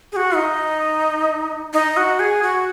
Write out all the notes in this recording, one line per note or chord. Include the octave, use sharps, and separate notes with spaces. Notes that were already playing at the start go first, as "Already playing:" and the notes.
G#4
F#4
D#4
D#4
F#4
G#4
F#4